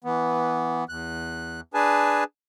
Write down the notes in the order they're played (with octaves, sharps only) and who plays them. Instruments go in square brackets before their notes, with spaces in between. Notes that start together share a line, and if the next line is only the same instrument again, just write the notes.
[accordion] E3 B3
E2 F#6
D4 G#4 B4 G#5 A5